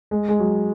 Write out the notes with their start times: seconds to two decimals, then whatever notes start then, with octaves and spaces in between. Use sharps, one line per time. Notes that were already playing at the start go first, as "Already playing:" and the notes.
0.11 G#3
0.29 G#3
0.40 F#3